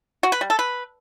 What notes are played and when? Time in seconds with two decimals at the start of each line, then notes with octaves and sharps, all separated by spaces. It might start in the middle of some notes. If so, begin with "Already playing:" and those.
0.23 F#4
0.32 B4
0.41 G3
0.50 A4
0.59 B4